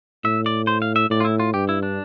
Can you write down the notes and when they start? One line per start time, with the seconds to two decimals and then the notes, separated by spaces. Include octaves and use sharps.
0.24 A2 E5
0.46 D5
0.67 C5
0.82 F5
0.96 E5
1.10 A2 D5
1.20 F4
1.25 E4
1.40 F4
1.54 G2 G4
1.69 E4
1.83 D4